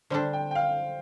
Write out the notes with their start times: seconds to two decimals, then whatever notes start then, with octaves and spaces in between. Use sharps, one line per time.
0.10 D3 G3 D4 A4 C5
0.33 G5
0.51 G5
0.55 F5